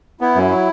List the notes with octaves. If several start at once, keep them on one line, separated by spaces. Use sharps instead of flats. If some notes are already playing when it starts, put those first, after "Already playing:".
B3 E4
F#2
F#3